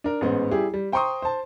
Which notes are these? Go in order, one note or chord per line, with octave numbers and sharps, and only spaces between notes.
D4 A#4
A1 G#2 B3 C5
G3 E4 G4 G#4
G3
C5 G5 A#5 C6 C#6 D#6
C5 A5